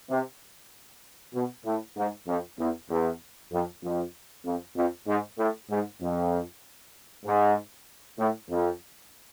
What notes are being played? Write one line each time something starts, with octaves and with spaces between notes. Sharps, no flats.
C3
B2
A2
G#2
F2
E2
E2
F2
F2
F2
F2
G#2
A2
G#2
F2
G#2
A2
F2